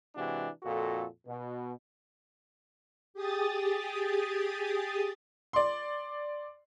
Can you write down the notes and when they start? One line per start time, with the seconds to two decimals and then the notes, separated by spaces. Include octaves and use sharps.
0.15 C3 E3 G#3 D4 F#4
0.63 F2 A#2 F#4 A4
1.26 B2
3.14 G4 G#4 D#6 A6
5.53 D5 C6